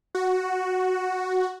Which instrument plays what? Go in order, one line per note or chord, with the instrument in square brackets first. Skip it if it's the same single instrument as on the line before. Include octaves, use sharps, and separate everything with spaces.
[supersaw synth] F#4